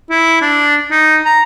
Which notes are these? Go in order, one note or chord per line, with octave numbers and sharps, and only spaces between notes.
E4
D4
D#4
A#5